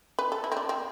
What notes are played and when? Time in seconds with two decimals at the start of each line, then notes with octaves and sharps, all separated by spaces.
0.19 B4
0.32 A4
0.44 E4
0.52 C4
0.57 D4
0.69 C4